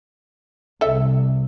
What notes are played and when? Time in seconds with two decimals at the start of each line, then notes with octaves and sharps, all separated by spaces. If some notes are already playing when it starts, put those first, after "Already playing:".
0.81 C2 A4 E5